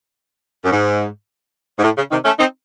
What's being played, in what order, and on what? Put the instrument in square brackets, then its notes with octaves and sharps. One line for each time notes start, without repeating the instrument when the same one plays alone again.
[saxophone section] F#2
G#2
G#2
A2
C#3
C3 D#3
A3 C#4
C4 D#4